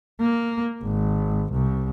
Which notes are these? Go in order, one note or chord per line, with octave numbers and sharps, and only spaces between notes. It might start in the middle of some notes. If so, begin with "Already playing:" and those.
A#3
G#1
C2